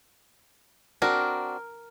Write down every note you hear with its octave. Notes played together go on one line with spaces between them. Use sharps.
C4 D4 F#4 A#4